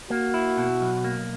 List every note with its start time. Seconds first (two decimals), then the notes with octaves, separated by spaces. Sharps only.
0.10 A#3 F#4
0.34 E4
0.58 B2
0.81 B1
1.04 A#3